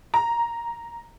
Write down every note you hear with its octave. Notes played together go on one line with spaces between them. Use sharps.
A#5